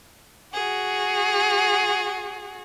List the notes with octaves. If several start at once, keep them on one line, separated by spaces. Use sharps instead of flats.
F#4 G#4